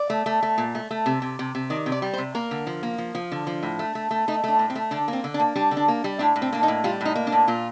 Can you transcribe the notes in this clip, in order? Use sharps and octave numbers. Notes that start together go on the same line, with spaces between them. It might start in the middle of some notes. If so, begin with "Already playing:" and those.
Already playing: D5
A3
A3
A3
A#2
A3
A3
C3
C3
C3
C3
D#3 D5
C3
D5
G3
C5
C3
A#3 A#4
D3
F3
A#3
F3
F3
D3
F3
A2
A3
A3
A3
A3 D#4
A3 D4
A2
C4
A3
D3 D4
A#3
C4
D3
D4
A#3
G3 D4
D3
D4
A#3
G3
A2 D4
A2
C4
A#3 D4
D#4
A2
G3 F4
A2 D#4
A#3
D4
A2
A#2 F4